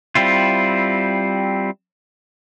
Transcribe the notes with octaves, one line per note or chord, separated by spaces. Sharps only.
G3 C4 E4 F4